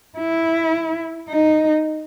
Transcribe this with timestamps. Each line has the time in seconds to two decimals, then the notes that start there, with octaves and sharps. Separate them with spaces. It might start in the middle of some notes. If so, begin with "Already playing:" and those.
0.19 E4
1.29 D#4